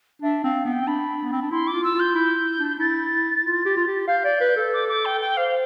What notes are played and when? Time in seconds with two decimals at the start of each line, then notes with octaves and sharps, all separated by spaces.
0.22 D4 E5
0.44 C4 F5
0.65 B3 G5
0.81 C4
0.87 D4 B5
1.23 B3
1.32 C4
1.42 D4
1.51 E4 C6
1.67 D6
1.73 F4
1.83 E6
1.95 F4 G6
2.15 E4
2.58 D4
2.79 E4 A6
3.44 F4
3.65 G4
3.77 F4
3.87 G4
4.08 F5 G6
4.24 D5
4.41 B4
4.57 A4
4.73 D6
4.88 D6
5.05 G5
5.21 G5
5.37 C5 F5